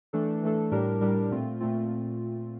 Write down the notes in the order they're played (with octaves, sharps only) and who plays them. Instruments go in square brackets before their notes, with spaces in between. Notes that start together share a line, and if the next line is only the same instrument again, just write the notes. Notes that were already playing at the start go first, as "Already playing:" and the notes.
[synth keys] E3 A3 D4 A4
E3 A3 D4 A4
A2 G3 D4 G4 A#4
A2 G3 D4 G4 A#4
A#2 A3 C4 F4
A#2 A3 C4 F4